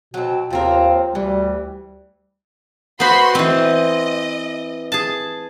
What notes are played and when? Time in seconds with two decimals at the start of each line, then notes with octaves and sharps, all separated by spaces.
0.14 B2 F#3 C4
0.51 D#2 F3 C4 F4 A#4
1.15 D2 E3 G3
3.00 B3 F#4 C5 B5 C6
3.35 E3 C4 D#5
4.92 G#4 A5